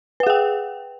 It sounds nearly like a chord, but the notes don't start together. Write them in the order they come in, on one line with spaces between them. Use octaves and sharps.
B4 F#5 G#4 G5